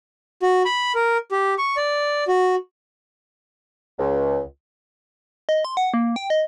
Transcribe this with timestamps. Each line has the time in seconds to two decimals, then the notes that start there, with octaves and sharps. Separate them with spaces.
0.42 F#4
0.65 B5
0.95 A#4
1.32 G4
1.58 C#6
1.77 D5
2.28 F#4
3.98 C#2
5.49 D#5
5.65 C6
5.77 F#5
5.94 A#3
6.16 G5
6.30 D#5